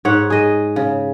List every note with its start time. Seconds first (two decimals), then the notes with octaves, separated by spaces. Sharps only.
0.05 G#2 C#5 F#5
0.30 G#4 D#5
0.76 C#3